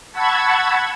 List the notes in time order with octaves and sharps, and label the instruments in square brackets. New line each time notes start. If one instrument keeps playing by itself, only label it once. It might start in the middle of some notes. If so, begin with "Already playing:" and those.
[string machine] F#5 A5 B5 C#6 E6 G#6